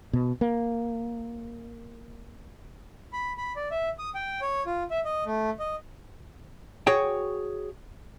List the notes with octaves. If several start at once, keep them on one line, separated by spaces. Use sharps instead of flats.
B2
A#3
B5
B5
D5
E5
D#6
G5
C#5
F4
E5
D#5
A3
D#5
F#4 G#4 C#5 G5